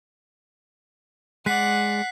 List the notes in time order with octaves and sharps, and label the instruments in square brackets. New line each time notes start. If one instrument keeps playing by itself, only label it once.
[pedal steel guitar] G#3 D5 [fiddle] F#5 [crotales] F#6 B6 C7